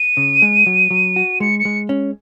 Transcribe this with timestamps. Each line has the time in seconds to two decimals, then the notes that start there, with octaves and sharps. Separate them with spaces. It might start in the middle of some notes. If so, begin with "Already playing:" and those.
Already playing: D#7
0.17 C#3
0.42 G#3
0.67 F#3
0.90 F#3
1.16 F#4
1.40 G#3 C#7
1.59 C#7
1.65 G#3
1.89 C#4